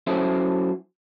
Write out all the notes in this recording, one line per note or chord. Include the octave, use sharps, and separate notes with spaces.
F#3 C#4 E4 A4 C5